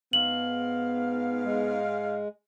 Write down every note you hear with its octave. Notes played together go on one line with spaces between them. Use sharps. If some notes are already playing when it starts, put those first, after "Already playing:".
G#2 B3 F5 F#7
G#3